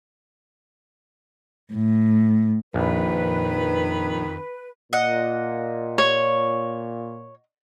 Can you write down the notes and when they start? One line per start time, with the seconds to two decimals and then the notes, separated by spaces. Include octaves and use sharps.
1.73 A2
2.74 A#1 F2 D#3 B4
4.93 A#2 D#5 F#5
5.98 C#5